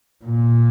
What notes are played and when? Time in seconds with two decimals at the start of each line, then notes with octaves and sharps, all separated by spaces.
0.25 A#2